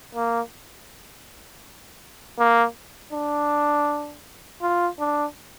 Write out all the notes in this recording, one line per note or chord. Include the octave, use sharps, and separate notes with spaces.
A#3
A#3
D4
F4
D4